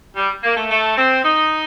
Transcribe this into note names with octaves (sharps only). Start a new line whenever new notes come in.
G3
A#3
A3
A3
C4
D#4